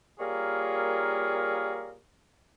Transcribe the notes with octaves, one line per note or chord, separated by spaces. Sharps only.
G3 A#3 F4 G#4 A#4 C#5